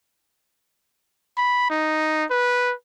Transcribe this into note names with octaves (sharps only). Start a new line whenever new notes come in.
B5
D#4
B4